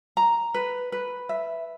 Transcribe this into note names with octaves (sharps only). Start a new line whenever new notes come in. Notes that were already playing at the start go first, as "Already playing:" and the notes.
A#5
B4
B4
E5